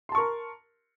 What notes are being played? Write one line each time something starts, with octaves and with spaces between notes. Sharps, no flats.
A#4 A5 C6 C#6